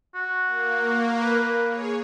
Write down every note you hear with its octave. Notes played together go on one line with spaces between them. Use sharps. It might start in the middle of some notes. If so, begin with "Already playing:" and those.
F#4
A#3
B4
G#4 C#5